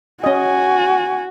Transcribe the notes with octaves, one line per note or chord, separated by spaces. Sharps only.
C#4 F#4 D#5 G#5